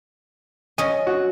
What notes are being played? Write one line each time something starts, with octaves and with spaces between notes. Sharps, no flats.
C#4 D#5 G#5
F#4